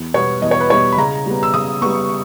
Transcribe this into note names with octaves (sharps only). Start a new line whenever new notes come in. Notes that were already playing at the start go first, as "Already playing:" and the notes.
Already playing: E2
B2 G3 B3 C#5
E2 D#5
C#5
B4
B2 G3 B3 C#5
B5
C#3 A#5
G3 B3
E6
C#3 D#6
G3 B3 C#6